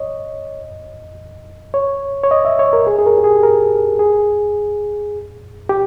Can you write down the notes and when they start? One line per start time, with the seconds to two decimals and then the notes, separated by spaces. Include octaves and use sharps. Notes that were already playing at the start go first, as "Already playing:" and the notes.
Already playing: C#5 D#5
1.74 C#5
2.24 C#5
2.31 D#5
2.45 E5
2.59 C#5
2.73 A#4
2.87 G#4
2.98 G#4
3.06 A#4
3.18 G4
3.24 G#4
3.43 A#4
3.99 G#4
5.69 G4